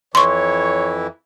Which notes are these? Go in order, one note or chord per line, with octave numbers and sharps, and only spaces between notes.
F2 E3 E4 C#5 C6 C#6